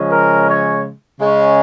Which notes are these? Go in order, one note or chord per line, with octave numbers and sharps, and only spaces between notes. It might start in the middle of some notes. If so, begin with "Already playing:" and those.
Already playing: C#3 F3 G#3 C#4
A#4
C#5
C#3 G#3 C#4